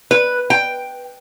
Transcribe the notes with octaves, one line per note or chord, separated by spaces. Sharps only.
B4
G5